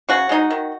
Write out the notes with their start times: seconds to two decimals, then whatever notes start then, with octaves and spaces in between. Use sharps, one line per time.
0.09 C#3 F#4
0.29 G#3 D#4
0.50 D#3